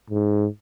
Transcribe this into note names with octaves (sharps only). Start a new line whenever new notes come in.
G#2